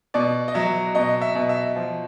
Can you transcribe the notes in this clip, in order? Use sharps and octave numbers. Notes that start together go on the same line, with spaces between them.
B2 D5
D#5
F#3 E5
B2 D#5
E5
B2
E5
F3